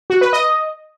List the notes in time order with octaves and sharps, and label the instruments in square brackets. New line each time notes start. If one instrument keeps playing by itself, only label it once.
[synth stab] F#4
B4
D#5